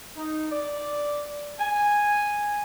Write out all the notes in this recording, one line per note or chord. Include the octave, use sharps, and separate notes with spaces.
D#4
D5
G#5